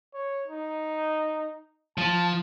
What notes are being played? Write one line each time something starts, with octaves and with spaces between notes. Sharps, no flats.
C#5
D#4
F3 A5